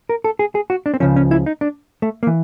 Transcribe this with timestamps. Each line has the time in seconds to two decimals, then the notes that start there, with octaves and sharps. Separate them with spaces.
0.09 A#4
0.24 A4
0.39 G#4
0.55 G#4
0.70 F#4
0.86 D4
0.94 C4
1.00 C#2 C#3 F3 C#4
1.16 C#4
1.31 E4
1.46 D#4
1.61 D4
2.02 A3
2.23 A#3
2.27 E3